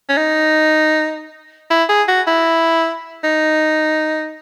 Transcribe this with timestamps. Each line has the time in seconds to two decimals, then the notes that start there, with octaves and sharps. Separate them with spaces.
0.09 C#4
0.17 D#4
1.70 E4
1.89 G#4
2.08 F#4
2.27 E4
3.24 D#4